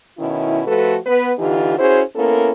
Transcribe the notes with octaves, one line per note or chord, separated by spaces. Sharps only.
B2 D#3 C#4 E4
F3 A3 F4 F#4 A4 B4
B3 B4
D3 E3 D#4 F4 G4
C#4 E4 F#4 G#4 C5
A#3 B3 C#4 E4 A4 A#4